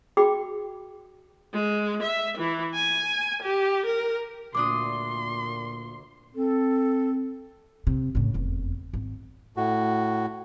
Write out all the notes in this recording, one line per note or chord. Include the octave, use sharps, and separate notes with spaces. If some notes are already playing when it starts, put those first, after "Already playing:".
F#4 G#4 G5 B5 D6
G#3
E5
E3
G#5
G4
A#4
D2 A#2 D4 C6 D6 D#6
C4 A4
C3
A2 C#3
F1 E2
G#1
A2 F#4